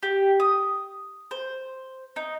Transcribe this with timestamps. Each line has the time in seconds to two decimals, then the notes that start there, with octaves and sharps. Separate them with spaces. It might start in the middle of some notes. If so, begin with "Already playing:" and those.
0.03 G4
0.40 D#6
1.31 C5
2.16 D#4